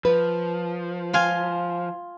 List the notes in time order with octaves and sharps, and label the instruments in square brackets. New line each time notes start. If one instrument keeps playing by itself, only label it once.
[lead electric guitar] F3 [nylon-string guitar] B4
[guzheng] F4 F5 G#5